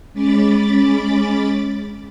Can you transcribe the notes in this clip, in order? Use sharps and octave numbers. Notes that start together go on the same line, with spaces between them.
G#3 C#4 B5 D6 A6